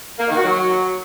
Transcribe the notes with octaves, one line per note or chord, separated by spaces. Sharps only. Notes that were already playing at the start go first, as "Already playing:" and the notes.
A#3
D#3
F#4
F#3